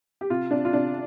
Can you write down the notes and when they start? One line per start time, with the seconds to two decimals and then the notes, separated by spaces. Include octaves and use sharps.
0.21 G4
0.30 C3 F4
0.51 C3 D4
0.65 F4
0.73 C3 D4